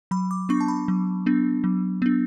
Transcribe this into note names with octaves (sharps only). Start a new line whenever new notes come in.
F#3 B5
D6
B3 D4 C#6
A5
B5
F#3
B3 D4
F#3
B3 D4